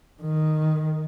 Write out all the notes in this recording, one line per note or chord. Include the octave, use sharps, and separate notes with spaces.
D#3